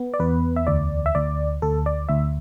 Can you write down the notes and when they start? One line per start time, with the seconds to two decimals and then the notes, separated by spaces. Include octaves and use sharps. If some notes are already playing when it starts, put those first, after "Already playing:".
Already playing: B3
0.14 D5
0.19 E2 B4
0.56 E5
0.67 D2 D5
1.06 E5
1.15 D2 D5
1.62 D2 A4
1.86 D5
2.09 D2 E5